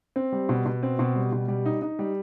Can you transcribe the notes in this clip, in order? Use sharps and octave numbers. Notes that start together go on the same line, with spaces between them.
C4
G3
B2
B2
C4
B2
G3
B2
G3
D#4
D#4
G3